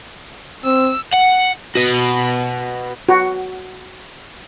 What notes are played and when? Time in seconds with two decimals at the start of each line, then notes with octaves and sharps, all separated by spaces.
0.65 C4 E6
1.14 F#5
1.75 F#4 B4
3.09 F#4